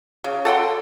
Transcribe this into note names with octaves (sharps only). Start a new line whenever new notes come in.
C#3
A4 F#5 G5 C6